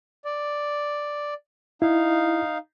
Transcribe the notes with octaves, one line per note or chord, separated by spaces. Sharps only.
D5
D#4 E4 F5